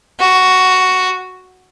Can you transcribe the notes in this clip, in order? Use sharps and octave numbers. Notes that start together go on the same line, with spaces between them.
F#4